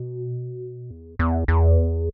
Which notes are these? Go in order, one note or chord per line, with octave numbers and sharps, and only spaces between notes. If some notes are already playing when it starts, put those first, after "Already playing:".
Already playing: B2
E2
E2
E2